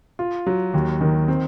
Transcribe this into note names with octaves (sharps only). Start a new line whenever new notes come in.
F4
F#3
D#2
D#3
C4